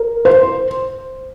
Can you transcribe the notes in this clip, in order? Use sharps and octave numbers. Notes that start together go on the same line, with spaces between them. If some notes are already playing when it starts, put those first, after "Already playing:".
Already playing: A#4
C5